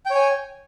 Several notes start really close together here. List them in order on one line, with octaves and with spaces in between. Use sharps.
G5 C#5 G#5